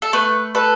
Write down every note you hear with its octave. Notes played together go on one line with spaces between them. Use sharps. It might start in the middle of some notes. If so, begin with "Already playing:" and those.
A4
A3 B4
A4 B4